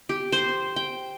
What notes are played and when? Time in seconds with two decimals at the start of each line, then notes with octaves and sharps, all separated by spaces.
0.09 G4
0.32 C5
0.76 G5